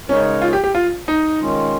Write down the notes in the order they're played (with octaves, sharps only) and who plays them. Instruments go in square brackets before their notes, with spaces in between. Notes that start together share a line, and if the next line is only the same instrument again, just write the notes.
[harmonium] C#3 G#3 D#4 A#4 C#5 [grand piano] C#4
[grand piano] F4
G4
G4
F4
D#4
[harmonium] D#3 G#3 C#4 F4